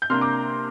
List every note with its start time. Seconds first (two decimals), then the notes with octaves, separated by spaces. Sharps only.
0.02 G6
0.10 C3 A#3 D4 C6 F6
0.21 A#5 D6